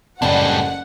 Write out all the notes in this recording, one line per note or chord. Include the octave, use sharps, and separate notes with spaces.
F#1 A2 G3 D4 A4 F#5 G#5